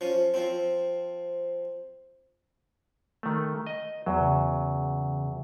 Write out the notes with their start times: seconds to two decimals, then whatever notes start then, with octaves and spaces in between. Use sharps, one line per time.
0.01 F3 C#4
0.34 F3 C4
3.23 D#3 A3
3.67 D#5
4.06 E2 F#3
4.20 C#3